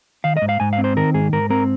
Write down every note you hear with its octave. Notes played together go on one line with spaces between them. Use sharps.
D#3 F5
D#5
G#2
F5
G#2 G#5
F5
C4
C5
D#3 A#4
G#2 G#4
G#2 A#4
C4 A#4